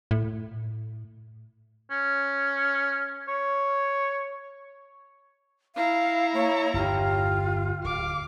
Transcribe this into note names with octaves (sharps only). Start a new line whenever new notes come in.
A2
C#4
C#5
E4 F5 A#5
A#3 C#5
G1 E2 F4 G4
D1 F5 D6